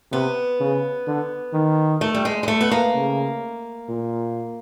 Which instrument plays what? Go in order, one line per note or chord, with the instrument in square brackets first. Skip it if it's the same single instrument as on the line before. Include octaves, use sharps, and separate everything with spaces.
[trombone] C3 [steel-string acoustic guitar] B3
[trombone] C#3
D3
D#3
[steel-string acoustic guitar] A3
G3
G#3
G#3
A3
B3
A#3
[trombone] C#3
A#2